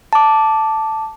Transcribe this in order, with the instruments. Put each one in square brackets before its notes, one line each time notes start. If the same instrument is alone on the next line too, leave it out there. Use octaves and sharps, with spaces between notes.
[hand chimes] A5 D6